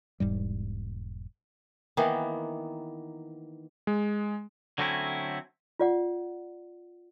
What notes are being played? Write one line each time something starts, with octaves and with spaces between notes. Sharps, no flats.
E1 G#2 G3
D#3 E3 A#3 B3
G#3
D3 F#3 A3 C4 C#4 E4
F4 D5 F#5